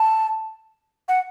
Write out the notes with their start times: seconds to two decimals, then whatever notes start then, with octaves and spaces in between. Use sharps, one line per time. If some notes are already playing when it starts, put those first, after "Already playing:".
Already playing: A5
1.08 F#5